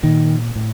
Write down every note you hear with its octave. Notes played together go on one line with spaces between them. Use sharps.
A#2 D#3
A2